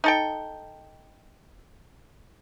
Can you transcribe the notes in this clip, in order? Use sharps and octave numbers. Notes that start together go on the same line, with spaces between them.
D#4 A4 G5